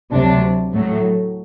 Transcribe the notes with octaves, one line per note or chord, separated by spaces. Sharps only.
D2 C3 F#3 D4
A2 F#3 A3